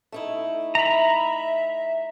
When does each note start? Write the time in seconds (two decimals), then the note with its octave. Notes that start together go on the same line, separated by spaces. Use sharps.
0.12 A3 D#4 E4
0.75 E5 A#5 B5